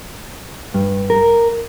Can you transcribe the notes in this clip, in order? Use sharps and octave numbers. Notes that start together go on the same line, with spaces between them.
G2
A#4